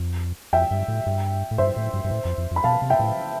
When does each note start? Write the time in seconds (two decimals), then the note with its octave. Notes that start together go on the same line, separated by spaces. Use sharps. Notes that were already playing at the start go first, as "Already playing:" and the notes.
Already playing: F2
0.53 F2 E5 G5
0.71 G2
0.88 A2
1.06 G2
1.51 A2
1.58 G2 C5 E5
1.76 A2
1.94 G2
2.04 G2
2.11 A2
2.25 F2
2.38 F2
2.51 F2
2.56 B5
2.64 B2 F5 A5
2.82 C3
2.90 E5 G5
3.00 A2